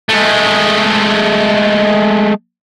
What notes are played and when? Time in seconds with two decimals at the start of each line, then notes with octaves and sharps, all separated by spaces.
0.09 G#3 A3